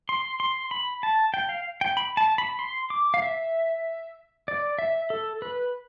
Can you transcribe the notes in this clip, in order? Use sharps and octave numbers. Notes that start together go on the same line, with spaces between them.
C6
C6
B5
A5
G5
F5
G5
B5
A5
B5
C6
D6
F5
E5
D5
E5
A4
B4